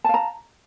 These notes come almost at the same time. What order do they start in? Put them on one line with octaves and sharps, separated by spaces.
A5 F5 A#5